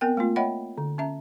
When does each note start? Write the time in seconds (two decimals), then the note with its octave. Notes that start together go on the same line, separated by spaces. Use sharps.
0.01 B3 C4 A#4 G5
0.17 A3 A#3 C4 F4
0.36 C#5 D#5 E5 F#5 G5 B5
0.78 D3
0.98 C#4 E5 A#5